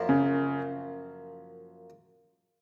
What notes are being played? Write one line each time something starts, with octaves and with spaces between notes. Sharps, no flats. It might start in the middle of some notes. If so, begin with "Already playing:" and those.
Already playing: F#2 F3 A#3
C#3